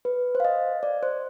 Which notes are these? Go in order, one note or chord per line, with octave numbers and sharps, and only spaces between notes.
B4
C5
F5
D#5
D5
C5